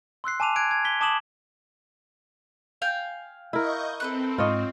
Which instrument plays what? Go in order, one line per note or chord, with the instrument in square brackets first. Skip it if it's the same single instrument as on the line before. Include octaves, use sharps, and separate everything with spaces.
[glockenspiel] C6 E6 F#6 C7
G#5 A5 D6 D#7 F7
A5 F#6 G#6 D7
G#6
B6 G7
A5 D6 D#6 E7 F#7
[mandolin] F5 G5 G#5
[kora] E4 A#4 [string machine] D#5 C#6 G6
[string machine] C4 [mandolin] A4 B4 F#6
[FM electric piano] G#2 [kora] F4 C#5 D#5